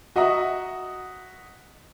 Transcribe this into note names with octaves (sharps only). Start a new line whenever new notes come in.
F#4 D#5 E5 F#5 A#5